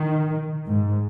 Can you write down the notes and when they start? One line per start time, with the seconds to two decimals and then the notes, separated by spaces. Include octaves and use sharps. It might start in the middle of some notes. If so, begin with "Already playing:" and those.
Already playing: D#3
0.69 G#2